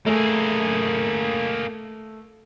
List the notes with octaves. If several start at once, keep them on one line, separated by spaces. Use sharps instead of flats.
A3 A#3 G#4